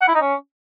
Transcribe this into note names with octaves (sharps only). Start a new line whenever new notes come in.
F#5
E4
D#4
C#4